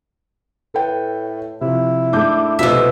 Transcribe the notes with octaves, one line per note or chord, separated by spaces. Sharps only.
A2 A4 B4 G5
C3 F3 E4
G#2 A3 D4 D6 G6
C2 F2 B2 D#4 F4 E5